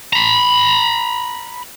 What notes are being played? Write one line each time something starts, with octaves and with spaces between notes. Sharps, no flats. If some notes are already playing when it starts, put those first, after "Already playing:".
A#5 B5